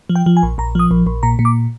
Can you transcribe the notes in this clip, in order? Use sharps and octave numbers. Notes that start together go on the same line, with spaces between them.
F3
G5
F3
G#5
A#1
A#1 A#5
F3 D#6
A#1
A#1
A#2 A#5
A#2
D6